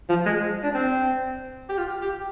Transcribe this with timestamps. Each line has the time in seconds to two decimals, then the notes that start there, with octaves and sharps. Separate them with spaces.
0.09 F3
0.25 G#3
0.63 D4
0.74 C4
1.69 G4
1.78 F4
2.02 G4